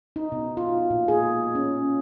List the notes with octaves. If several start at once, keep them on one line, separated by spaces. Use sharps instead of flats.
D#4
B2
F4
A#2
G#4
C#4